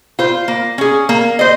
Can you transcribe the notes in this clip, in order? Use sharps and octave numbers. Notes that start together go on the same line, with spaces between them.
F4 C5
A#3
C#4 G#4
A#3
C5 D#5